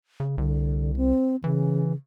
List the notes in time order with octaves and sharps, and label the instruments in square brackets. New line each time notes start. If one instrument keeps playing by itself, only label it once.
[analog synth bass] C#3
[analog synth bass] C2 [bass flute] D3
[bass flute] C4
[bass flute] C#3 [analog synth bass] E3